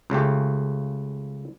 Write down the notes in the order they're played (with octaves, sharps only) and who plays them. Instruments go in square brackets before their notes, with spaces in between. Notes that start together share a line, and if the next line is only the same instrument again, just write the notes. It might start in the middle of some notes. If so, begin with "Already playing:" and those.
[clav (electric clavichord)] C#2 C#3 A3 G4